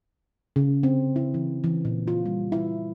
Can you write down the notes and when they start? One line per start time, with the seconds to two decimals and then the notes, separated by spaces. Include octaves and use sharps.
0.56 C#3
0.83 C4
1.16 E4
1.34 E3
1.64 E3
1.85 A#2
2.08 F4
2.26 G3
2.52 E4